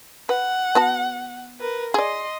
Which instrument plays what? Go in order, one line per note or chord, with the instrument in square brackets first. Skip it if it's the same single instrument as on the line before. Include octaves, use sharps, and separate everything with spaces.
[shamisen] B4 [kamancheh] F#5
[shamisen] B3 F#4 A5
[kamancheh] A#4 B4
[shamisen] G#4 D5 [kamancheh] D#5 C6